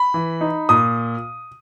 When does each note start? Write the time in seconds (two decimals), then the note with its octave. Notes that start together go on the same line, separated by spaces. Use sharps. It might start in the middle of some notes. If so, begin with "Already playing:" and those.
Already playing: B5
0.14 E3
0.41 D#4
0.69 A#2 D#6